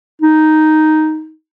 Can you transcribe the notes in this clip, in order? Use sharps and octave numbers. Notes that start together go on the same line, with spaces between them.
D#4